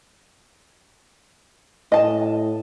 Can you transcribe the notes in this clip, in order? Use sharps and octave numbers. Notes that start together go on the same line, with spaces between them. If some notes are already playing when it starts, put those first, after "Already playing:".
A2 D#5 A5